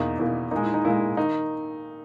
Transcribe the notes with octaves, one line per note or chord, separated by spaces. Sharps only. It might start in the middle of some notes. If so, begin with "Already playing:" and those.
Already playing: E2 B2 A#3 D#4
E2 B2 A#3 E4
A#2 G#3 D#4
E4
D#4
A#2 G#3 E4
D#3 D#4